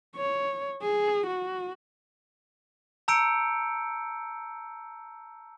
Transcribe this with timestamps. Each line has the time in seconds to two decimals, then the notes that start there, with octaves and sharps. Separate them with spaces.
0.16 C#5
0.81 G#4
1.26 F#4
3.08 A5 A#5 E6 G6 C#7 D7